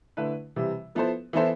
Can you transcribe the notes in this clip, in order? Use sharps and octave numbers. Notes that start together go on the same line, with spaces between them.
D3 A3 E4 B4
C3 E3 G3
F3 B3 E4 A4 C5
E3 B3 E4 A4 C5